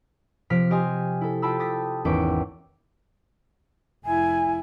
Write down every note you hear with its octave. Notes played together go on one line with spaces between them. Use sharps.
C3 F3 F6 B6 D7
G4 D#5 G#5 C6 F6
E4 A4
F4 G5 A5 B5 E6
A5 D6 D#6 G6 A6 B6
G#1 E2 C#4 E5 G5 D6
F1 E4 G#5